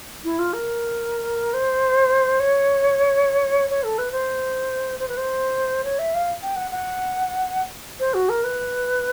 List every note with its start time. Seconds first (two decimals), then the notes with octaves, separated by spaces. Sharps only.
0.24 E4
0.38 F4
0.53 A#4
1.53 C5
2.39 C#5
3.70 C#5
3.83 A4
3.98 B4
4.11 C5
4.99 C5
5.08 B4
5.17 C5
5.84 C#5
5.98 E5
6.14 F5
6.42 G5
6.56 F#5
6.71 F#5
7.99 C5
8.13 F#4
8.29 A#4
8.43 B4